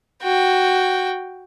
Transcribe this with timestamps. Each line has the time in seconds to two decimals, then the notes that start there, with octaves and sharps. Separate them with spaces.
0.22 F#4 G5